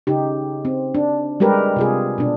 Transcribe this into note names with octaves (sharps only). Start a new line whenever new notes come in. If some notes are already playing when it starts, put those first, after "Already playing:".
C#3 D#4 G4
C4
D4
G3 G#3 G4 A#4 B4
C3 F4 G#4
B2 D4